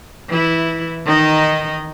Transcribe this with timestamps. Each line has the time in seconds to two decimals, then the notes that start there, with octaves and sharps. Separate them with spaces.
0.29 E3 E4
1.05 D#3 D#4 D#5